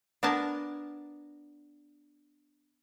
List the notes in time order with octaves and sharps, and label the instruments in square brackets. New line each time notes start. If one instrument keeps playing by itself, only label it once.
[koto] B3 D4 A#4 G#5 A5